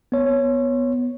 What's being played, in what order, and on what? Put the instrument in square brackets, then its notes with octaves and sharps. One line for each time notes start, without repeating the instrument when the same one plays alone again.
[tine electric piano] B3 C#5